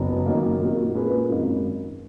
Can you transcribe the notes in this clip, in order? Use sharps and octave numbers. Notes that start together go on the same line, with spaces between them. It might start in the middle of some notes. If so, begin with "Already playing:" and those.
Already playing: F#1 F#2 F#3 B3
F#2 D#3 A#3
A#2 A#3 D#4 F#4
A#2 A#3 C#4 G#4 B4
G#1 F#2 D#3 A#3